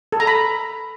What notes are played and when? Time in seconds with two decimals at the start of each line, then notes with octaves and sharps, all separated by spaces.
0.12 A4
0.20 A#5
0.27 B5